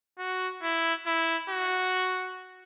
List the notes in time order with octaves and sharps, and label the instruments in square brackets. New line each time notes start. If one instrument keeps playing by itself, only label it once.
[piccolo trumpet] F#4
E4
E4
F#4